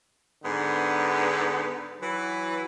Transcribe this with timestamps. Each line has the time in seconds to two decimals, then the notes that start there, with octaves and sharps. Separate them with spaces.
0.44 G#2 D3 B3
2.01 E3 F#3 E4 B4